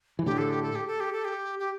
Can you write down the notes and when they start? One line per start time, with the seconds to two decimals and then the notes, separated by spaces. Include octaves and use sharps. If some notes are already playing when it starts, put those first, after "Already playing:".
0.19 E3
0.26 A2 D3 G4
0.38 A4
0.50 G4
0.63 A4
0.75 G4
0.87 A4
1.00 G4
1.13 A4
1.25 G4
1.59 G4